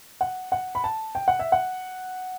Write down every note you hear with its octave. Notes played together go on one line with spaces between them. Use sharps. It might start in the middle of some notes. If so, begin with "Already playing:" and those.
F#5
F#5
B5
A5
G5
F#5
E5
F#5